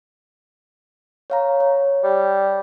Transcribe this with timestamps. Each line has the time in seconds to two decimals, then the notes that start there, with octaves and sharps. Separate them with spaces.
1.30 C#5 F5 A#5
1.60 C#5
2.04 G3